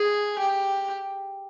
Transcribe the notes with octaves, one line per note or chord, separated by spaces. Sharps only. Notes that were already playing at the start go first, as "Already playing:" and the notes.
Already playing: G#4
G4